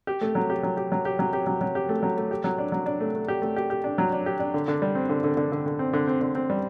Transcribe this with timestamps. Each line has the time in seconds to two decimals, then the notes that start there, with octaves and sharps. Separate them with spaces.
0.07 G4
0.21 A3
0.35 F#3
0.50 G4
0.63 F#3
0.77 G4
0.92 F#3
1.05 G4
1.19 F#3
1.33 G4
1.47 F#3
1.61 F#3
1.75 G4
1.89 A3
2.03 F#3
2.17 A3
2.31 G4
2.44 F#3
2.58 D4
2.72 F#3
2.86 D4
3.00 A3
3.15 A3
3.28 G4
3.42 A3
3.56 G4
3.70 G4
3.84 D4
3.98 F#3
4.12 D4
4.26 G4
4.39 D4
4.54 D3
4.68 D3
4.82 G3
4.95 C4
5.09 D3
5.24 D3
5.37 D3
5.52 D3
5.66 D3
5.79 C4
5.93 D3
6.07 C4
6.21 D3
6.35 C4
6.50 G3